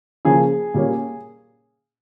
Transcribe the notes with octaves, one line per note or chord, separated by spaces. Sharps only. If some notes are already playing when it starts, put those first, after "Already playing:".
C#3 F3 A#3 C#4 G#4
A#2 G3 A#3 C#4